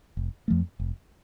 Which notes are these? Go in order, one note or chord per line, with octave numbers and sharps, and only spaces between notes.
F1
F2 F3 A3
F1